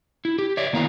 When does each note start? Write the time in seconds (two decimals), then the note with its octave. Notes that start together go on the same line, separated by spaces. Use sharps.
0.25 E4
0.39 G4
0.57 C#5 D5 E5
0.73 D#3 A#3 B3 E4 F5 A#5